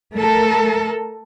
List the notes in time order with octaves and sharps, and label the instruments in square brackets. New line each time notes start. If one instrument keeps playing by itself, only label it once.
[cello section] A3 A4 A#4